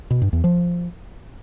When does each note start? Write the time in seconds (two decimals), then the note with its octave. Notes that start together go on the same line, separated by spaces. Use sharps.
0.11 B2
0.22 G2
0.33 E2
0.44 F3